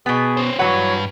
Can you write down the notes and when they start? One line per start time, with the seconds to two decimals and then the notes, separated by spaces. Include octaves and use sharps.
0.06 B2 B3 G#4
0.37 C#4 C5
0.59 G2 E3 F#3 B4 C#5 F#5